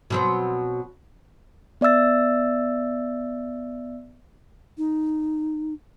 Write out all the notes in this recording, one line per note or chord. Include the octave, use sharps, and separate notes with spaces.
B2 F#3 C4
B3 D5 E5 E6 A6
D#4